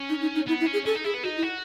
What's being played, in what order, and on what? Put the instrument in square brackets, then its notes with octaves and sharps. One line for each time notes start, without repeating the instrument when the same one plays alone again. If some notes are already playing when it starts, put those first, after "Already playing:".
Already playing: [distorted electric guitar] C#4
[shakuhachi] D#4
D#4
D#4
[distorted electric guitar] B3 [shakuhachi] E4
[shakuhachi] E4
[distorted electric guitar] C#4
[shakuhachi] G#4
[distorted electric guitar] C#4 [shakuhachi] A4
[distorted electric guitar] D#4
[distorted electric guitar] E4 [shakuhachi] G#4
[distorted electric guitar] B3
[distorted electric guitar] D#4 [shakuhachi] F#4
[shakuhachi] E4
[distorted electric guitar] F#4